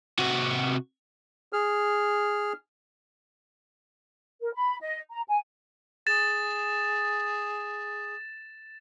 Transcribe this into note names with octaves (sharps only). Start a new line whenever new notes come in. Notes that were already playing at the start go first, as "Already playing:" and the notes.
C3 F#4
G#4 F6
A#4
B5
D#5
A#5
G#5
G#4 A6 E7